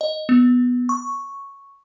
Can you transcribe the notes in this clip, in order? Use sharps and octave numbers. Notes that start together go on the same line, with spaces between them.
D#5
B3
C#6